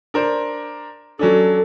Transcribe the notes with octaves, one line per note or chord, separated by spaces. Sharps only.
D4 A#4 C5
F#3 C#4 D4 A4